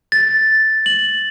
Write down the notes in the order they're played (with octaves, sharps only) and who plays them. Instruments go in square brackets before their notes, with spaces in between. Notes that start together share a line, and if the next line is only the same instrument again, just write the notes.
[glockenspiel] A6
F#7